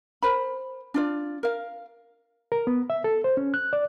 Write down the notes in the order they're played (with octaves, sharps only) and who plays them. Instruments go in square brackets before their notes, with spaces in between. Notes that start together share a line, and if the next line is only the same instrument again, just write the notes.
[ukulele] A#4 C5 B5
D4 F4 D5
A#4 F5
[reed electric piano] A#4
B3
E5
A4
C5
C#4
F#6
D5